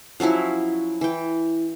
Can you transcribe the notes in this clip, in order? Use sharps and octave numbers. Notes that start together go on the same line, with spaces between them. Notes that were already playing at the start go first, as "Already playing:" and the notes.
F3 F#3 C#4 E4
E3 G5